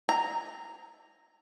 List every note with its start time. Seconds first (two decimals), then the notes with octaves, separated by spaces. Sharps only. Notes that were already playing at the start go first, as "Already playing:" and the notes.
0.09 A#5